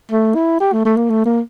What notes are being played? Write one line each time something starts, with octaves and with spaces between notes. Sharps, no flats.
A3
E4
G4
A3
A3
A#3
A3
A#3